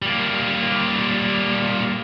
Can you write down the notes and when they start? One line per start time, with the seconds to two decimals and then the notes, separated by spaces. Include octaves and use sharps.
0.02 G3 A#3